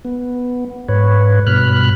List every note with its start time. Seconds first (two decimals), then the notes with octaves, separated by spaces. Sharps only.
0.05 B3
0.88 G#2 B4 C#5
1.47 G2 B2 B5 F6 F#6